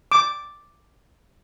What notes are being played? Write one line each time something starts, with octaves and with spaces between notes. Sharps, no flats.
D6